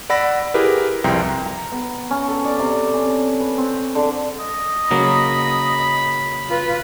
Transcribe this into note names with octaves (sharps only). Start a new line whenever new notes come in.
D5 F#5 B5 E6 A#6
E4 G4 G#4 A#4 B4
C2 F2 G5 A#5 C6
A#5
B3
C#4
A4
D5
C3
C#4
B4
C4
D3
D#5
C#3 F#3 A#3 B5
F4 B4